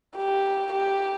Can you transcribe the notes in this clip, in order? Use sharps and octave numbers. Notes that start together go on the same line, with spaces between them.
G4
G4